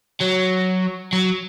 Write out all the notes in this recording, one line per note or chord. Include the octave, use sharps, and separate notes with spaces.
F#3
F#3